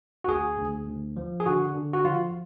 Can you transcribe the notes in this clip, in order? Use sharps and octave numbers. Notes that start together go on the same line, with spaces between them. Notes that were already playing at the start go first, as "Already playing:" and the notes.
F#4
D2 G#4
D2
D2
F3
G#4
D3 F#4
D3
F#4
F3 F4